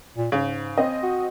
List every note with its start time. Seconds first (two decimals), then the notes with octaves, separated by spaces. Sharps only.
0.17 A#2
0.32 G#2 C#3
0.78 C4 D#5
1.03 F#4